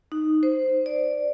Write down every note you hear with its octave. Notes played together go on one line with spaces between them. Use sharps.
D#4
C5
D5